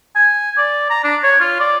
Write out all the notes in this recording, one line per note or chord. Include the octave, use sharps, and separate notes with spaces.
G#5
D5
A#5
D4
C#5
F4
D5